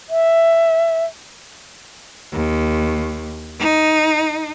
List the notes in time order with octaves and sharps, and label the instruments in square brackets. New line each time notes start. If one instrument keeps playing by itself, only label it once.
[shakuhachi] E5
[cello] D#2
D#4